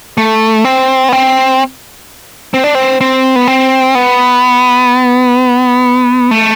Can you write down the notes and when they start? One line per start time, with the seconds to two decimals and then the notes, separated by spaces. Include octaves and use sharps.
0.18 A3
0.64 C4
1.09 B3
1.12 C4
2.54 C4
2.64 D4
2.75 C4
3.01 C4
3.36 B3
3.47 C4
3.95 B3
6.31 A3